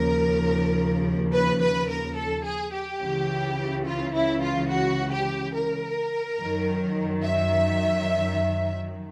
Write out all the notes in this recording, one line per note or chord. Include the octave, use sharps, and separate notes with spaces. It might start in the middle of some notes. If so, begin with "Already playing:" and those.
Already playing: D#2 C#3 F3 A#4
B4
B4
A#4
A4
G#4
G4
C#2 C#3 E3
F4
E4
F4
F#4
G4
A#4
F#2 D#3 F#3
E5